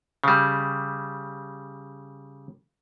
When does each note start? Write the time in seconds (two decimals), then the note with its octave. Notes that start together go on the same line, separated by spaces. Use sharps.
0.24 C#3 G3